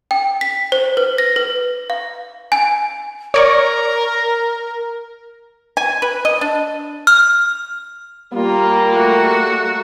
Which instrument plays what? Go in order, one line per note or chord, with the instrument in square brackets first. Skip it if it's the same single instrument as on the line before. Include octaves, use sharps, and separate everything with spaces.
[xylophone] G5
B6
C5
B4
A#6
B4
F5
G#5
[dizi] A#4 [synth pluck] C#5 D5 C#6
[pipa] G#5
B4
D#5
D4
[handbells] F6
[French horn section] G3 A#3 [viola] F4
[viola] A3 F#4